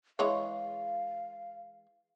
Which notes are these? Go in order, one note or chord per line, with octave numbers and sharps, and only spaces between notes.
E3 G#3 C#5 F5